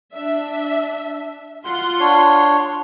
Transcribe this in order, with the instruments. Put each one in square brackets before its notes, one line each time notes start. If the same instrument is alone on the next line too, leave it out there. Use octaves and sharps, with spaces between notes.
[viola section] D4 E5
F4 F#5 C6
[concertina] D4 C#5